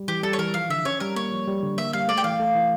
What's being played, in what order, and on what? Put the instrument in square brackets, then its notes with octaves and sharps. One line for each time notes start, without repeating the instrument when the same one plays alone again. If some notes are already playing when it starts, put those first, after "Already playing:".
Already playing: [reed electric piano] G3
[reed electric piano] E3 [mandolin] G4
[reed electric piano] G3 [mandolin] A4
[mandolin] C#5
[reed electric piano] E3 [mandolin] A#4
[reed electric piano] F3 [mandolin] F5
[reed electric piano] D3 [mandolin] E5
[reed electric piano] C#4 [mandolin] C#5
[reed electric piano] G3 [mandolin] A#4
[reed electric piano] A#3 [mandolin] C#5
[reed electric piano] F3
G3
D3
[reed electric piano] A#3 [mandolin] E5
[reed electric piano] G3 [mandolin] F5
[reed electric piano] A3 [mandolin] D5
[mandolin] G5
[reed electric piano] E3 [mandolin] F5
[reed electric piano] A3
E3